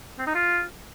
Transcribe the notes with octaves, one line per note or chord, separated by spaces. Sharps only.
C4
D#4
F4